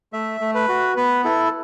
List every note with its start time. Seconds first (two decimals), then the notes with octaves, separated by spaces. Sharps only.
0.13 A3 E5
0.41 A3
0.55 B4
0.69 F#4
0.97 B3 B4
1.24 E4 A4